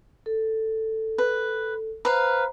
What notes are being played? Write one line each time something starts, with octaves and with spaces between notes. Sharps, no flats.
A4
B4
B4 C5 F5 A#5